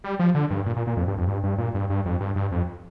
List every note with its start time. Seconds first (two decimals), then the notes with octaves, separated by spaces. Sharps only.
0.04 G3
0.19 F3
0.35 D3
0.50 G2
0.66 A#2
0.76 A#2
0.87 A#2
0.97 F2
1.08 G2
1.18 F2
1.28 G2
1.44 G2
1.58 A#2
1.74 G2
1.90 G2
2.05 F2
2.21 G2
2.36 G2
2.52 F2